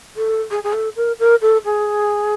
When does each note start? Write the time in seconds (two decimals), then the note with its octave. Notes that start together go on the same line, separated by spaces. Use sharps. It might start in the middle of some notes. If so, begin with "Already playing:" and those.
0.16 A4
0.51 G#4
0.64 G#4
0.73 A4
0.96 A#4
1.19 A#4
1.42 A4
1.65 G#4